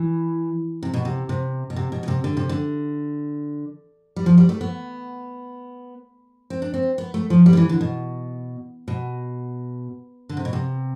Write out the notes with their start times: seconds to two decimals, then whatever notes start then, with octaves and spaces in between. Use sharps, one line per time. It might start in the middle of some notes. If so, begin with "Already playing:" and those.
Already playing: E3
0.83 C3
0.94 B2
1.05 C3
1.29 C3
1.70 B2
1.76 C3
1.92 B2
2.03 B2
2.08 C3
2.24 D3
2.37 C3
2.49 D3
4.16 G3
4.26 F3
4.38 G3
4.49 A3
4.61 B3
6.50 C4
6.62 D4
6.74 C4
6.98 B3
7.14 A3
7.30 F3
7.46 G3
7.53 D3
7.57 E3
7.69 D3
7.81 B2
8.88 B2
10.29 D3
10.37 C3
10.45 B2
10.53 C3